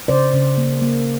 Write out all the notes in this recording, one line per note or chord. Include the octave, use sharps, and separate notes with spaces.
C#3 C5 D5
C#3
A#3
A#3